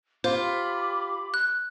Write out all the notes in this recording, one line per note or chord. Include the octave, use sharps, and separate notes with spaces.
F4 G4 C5 B5 D6
F#6